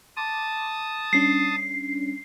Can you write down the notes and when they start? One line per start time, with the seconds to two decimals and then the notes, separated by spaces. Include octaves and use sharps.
0.17 A5 C6 D6 D#6
1.13 G3 C#4 D4 C7